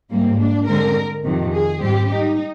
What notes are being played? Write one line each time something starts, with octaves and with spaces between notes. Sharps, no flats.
G#2 G3 A#3 C4
D4
D3 G#3 C4 A#4
F2 C3 D#3
G#4
G#2 G3 C4 G4
D#4